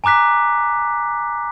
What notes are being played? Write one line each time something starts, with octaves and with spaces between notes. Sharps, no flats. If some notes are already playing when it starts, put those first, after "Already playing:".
G#5 A#5 D6 F#6 B6